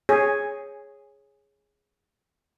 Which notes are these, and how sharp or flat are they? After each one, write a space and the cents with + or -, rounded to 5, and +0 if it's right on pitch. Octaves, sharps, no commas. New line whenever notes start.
G#4 +0 C#5 -5